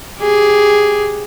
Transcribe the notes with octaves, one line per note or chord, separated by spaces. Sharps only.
G4 G#4